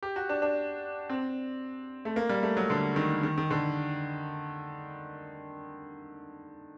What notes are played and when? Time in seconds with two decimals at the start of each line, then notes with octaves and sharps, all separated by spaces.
0.03 G4
0.16 F#4
0.29 D4
0.42 D4
1.09 C4
2.05 A3
2.16 A#3
2.29 G3
2.43 A3
2.57 F#3
2.70 D3
2.96 D#3
3.23 D#3
3.38 D#3
3.51 D3